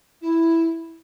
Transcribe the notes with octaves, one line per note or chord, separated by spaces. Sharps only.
E4